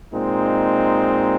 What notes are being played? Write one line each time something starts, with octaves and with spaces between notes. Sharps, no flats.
A#2 G#3 C4 D#4